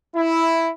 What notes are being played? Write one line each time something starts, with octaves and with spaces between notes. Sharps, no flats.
E4